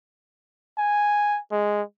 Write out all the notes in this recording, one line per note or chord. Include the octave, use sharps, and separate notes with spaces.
G#5
G#3